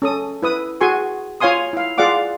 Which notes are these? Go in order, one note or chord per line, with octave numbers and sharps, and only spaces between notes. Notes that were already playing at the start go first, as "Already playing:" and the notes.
C#4 A4 D#6
E4 B4 D#6
F#4 G#4 G#5 C6 C#6
F4 C#5 F5 G#5 C6 D#6
E4 F5
F4 G#4 D5 F5 F#5 D6